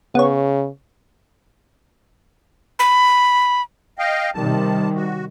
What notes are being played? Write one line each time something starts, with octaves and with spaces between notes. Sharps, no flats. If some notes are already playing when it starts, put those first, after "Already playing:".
C#3 B3 C#5
B5
D#5 F5 G5
C3 D#3 G3 A5
F#4